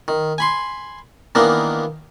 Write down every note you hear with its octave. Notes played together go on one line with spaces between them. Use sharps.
D#3
G#5 B5 C6
D#3 E3 A#3 B3 D4 D#4